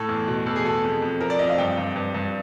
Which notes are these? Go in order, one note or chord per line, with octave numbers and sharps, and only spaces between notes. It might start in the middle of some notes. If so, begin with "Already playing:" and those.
Already playing: A2 A4
E2
B2
E2 A4
G#4
B2 A4
F2
F2
F3 A#4
D5
F2 D#5
F5
G2 G5
G2
G2
G2